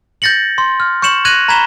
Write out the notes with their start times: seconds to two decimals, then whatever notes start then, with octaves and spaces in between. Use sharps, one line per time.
0.22 G6 A6 A#6 C#7 F#7
0.58 C6
0.80 F6
1.02 C#6 G6 C#7 E7 F#7
1.25 F#6 G#6 A#6 D#7 F7 F#7
1.48 A#5 B5 G#6 B6 E7 G7